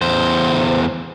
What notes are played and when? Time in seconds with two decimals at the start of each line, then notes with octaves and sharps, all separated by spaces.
0.02 E2 C5